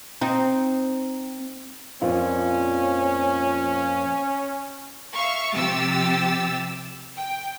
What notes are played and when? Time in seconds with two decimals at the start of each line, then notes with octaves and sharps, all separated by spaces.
0.21 C4 D#4
2.01 F2 A#2 F3 C#4
5.13 E5 F5 C#6
5.53 C3 F3 G4 E6 A6
7.17 G5